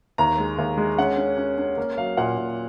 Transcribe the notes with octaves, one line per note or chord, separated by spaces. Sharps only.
D#2 A#5
G#3
D#2
G#3
C#4 F#5
C#4
C#4
C#4
A#3
F#3 F5
A#2 F#5
A#2